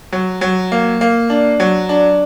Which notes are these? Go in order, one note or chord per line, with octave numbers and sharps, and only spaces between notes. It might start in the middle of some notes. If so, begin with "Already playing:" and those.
F#3
F#3
A#3
A#3
D4
F#3
D4